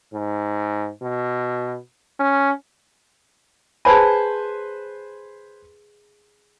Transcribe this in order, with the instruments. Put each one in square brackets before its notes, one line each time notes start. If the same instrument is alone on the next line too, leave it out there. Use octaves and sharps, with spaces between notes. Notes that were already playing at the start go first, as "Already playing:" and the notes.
[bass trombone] G#2
B2
C#4
[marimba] G#4 A5 B5 [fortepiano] B4 C5 G#5